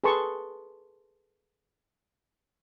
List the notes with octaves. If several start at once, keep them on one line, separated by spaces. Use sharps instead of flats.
G#4 A4 B4 A5 C6 C#6